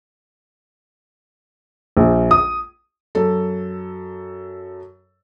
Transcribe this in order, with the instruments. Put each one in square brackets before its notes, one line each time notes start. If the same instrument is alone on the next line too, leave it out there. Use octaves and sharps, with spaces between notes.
[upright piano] A#1
D#6
[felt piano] F#2 A4